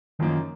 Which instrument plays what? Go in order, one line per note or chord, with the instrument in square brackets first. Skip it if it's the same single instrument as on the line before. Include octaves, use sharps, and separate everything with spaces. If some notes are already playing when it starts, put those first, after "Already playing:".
[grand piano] F#2 F3 A#3 D#4 [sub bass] D#3